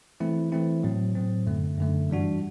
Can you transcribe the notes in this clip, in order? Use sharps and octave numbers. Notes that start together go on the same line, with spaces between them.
E3 A3 C4 E4
E3 A3 C4 E4
A2 F#3 C4
A2 F#3 C4
F#2 D3 A3
F#2 D3 A3
G2 E3 G3 D4 F#4